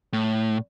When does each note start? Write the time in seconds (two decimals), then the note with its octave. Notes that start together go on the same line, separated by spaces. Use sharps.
0.13 A2